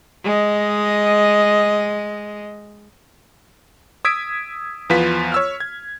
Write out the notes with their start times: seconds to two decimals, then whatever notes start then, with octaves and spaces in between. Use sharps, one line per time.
0.24 G#3 D#5
4.05 D#6 E6 G#6 B6 D7
4.90 E2 F3 B3 F4 B4 B6
5.32 C#5 E6 F6
5.60 G#6